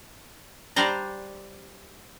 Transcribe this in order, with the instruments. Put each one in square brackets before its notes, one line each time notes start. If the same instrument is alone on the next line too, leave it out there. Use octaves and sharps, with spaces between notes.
[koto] G3 D4 C5 A#5